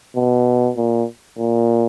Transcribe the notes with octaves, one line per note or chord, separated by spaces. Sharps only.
B2
A#2
A#2